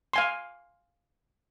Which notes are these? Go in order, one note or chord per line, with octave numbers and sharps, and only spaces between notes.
F5 G#5 C6